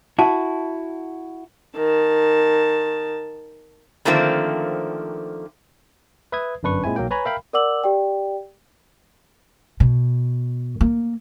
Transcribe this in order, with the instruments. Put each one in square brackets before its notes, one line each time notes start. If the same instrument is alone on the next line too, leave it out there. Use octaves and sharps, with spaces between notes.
[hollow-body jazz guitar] E4 F#4 [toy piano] A5
[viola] D#3 A5
[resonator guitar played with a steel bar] D3 D#3 F3 A3 A#3 C4
[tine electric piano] B4 E5 D#6 G#6
G1 F#2 D4 B4 C#6
A#2 G#3 C4 E4 G#5
B1 F#3 A#3 G5
B4 C#5 G#5 A#5 B5
A#4 E5 F5 G5 B5
[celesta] A#4 D5 F#5 D6 E6 F#7
G4 D5 G5
[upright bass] B2
A#3